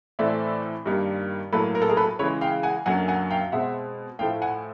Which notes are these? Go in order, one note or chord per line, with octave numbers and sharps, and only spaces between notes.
A2 E3 A3 C4 D5 E5
G2 D#3 G3 A#3
A2 F#3 A#3 A4 B4
A#4
A4
G#4 A#4
A4 B4
C#3 E3 G#3 B4 C#5
F5 G5
F#5 G#5
F#2 D3 F#3 A#3 F#5 G#5
F#5 G#5
F5 G5
B2 G#3 C4 E5 F#5
A2 F3 A3 F5 G5
F#5 G#5